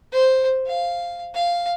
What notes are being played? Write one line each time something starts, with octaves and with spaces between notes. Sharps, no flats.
C5
F5
F5